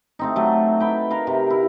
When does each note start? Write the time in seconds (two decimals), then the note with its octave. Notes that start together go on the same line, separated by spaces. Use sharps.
0.19 A3 C4 D#4
0.36 F#3 A3
0.80 B4 G5
1.11 A#4 B4 F5
1.27 C3
1.50 E4